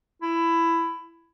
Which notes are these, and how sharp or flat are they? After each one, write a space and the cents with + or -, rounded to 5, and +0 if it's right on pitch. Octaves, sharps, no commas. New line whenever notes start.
E4 +15